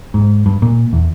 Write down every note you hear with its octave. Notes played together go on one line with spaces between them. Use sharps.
G#2
G2
A#2
E2